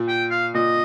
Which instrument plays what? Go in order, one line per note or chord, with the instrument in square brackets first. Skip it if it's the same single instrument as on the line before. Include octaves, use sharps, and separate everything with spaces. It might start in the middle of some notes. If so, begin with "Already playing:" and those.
Already playing: [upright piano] A#2
[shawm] G5
F5
[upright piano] A#2 [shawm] D#5